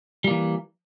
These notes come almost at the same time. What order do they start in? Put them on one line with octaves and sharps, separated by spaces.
G3 A#3 E3